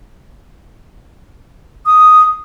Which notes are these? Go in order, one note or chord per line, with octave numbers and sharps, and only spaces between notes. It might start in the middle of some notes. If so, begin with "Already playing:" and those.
D#6